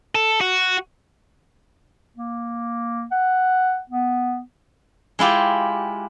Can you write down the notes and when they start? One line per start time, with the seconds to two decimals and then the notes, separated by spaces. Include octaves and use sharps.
0.15 A4
0.41 F#4
2.17 A#3
3.11 F#5
3.90 B3
5.19 G#3 E4 F4 G4